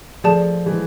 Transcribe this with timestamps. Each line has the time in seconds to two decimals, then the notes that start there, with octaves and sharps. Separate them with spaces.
0.24 F3 A3 G#4 D5 A5
0.66 E3 G#3